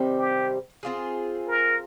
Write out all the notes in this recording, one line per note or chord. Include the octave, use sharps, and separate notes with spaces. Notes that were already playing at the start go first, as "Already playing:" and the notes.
Already playing: C3 D#3 G3 C4
G4
C4 F4 G#4
A#4